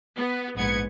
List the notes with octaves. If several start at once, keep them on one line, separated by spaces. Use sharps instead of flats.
B3
A#1 G#2 B3 G#6 C#7